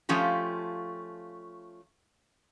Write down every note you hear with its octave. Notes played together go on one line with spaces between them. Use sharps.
F3 A3 C#4 F4 G4